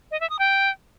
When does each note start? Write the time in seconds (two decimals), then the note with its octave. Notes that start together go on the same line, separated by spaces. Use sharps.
0.11 D#5
0.20 E5
0.30 D#6
0.39 G5